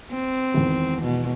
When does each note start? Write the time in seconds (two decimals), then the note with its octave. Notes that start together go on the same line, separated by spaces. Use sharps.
0.11 C4
0.54 G#1 E2
1.02 B2